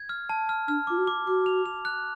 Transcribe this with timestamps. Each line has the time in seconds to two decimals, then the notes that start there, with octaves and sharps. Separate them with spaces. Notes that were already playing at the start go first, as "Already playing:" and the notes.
Already playing: G#6
0.09 F6
0.29 A5
0.49 F6
0.68 D4 F6
0.87 F4 D6
0.98 F#4
1.07 D6
1.27 F#4 D6
1.46 F7
1.66 F7
1.85 F#6